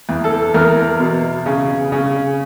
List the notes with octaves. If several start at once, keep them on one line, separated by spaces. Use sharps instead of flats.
E2
A4
E2 A#4
B2
C#3
C#3